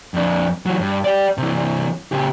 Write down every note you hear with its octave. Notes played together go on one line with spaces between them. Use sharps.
F2 D4
E3 F#3
G2
G4 D5
C3 E3
C#3 G4